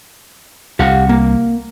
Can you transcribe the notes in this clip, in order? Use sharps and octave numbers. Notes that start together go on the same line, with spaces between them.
C2 G4 F5 F#5
A#3